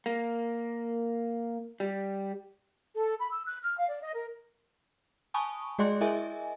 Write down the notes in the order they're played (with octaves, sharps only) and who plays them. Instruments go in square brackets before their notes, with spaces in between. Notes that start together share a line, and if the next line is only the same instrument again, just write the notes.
[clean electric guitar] A#3
G3
[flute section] A4
B5
E6
F#6
F6
F5
D5
D#5
A#4
[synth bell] G#5 A5 B5 C#6 D#6
G#3 G#4 D5 D#5 C6 F#6
E4 G#4 A#4 D#5 E5 G#5